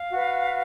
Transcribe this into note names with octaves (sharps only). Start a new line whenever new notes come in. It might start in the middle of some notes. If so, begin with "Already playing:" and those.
Already playing: F5
F#4 B4